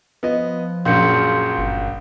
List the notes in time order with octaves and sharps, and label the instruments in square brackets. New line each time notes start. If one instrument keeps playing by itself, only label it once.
[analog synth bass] F3 [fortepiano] B3 D#5
[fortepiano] A#1 F#2 [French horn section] F4 G#4 [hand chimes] C6 G6 C#7
[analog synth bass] G1